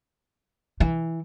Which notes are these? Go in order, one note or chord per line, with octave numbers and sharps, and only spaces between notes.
E3